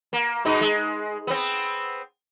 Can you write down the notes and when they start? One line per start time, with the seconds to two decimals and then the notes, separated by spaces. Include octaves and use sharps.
0.13 A#3
0.45 B2 G#3 D#4
0.61 G#3
1.27 B3 C4